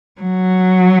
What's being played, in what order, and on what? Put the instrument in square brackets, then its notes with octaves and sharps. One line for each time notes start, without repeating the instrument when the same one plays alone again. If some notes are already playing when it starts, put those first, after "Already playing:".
[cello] F#3